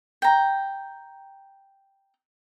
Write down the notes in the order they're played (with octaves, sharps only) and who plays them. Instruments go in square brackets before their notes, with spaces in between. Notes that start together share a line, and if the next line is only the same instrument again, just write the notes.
[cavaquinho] G5 A#5